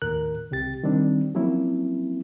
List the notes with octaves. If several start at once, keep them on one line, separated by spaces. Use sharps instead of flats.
D#2 A2 A#4 F#6
C2 C3 G4 A6
D#3 G3 C4 D4
F3 F#3 A#3 C4 C#4 E4